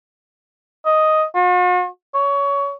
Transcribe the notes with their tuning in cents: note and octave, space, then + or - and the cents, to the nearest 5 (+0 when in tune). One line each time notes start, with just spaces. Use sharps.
D#5 +5
F#4 -45
C#5 +20